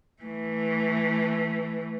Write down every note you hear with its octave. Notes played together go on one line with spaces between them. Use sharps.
E3 A3